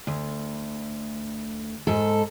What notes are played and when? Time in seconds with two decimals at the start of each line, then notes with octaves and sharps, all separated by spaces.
0.07 D2
1.87 G#2 A4